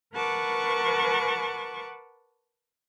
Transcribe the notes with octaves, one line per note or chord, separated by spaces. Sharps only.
A#4 B4 F#5 A5 C#6 D6